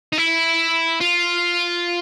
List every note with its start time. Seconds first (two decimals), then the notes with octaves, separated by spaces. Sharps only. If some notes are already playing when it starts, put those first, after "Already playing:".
0.13 D#4
0.18 E4
1.01 F4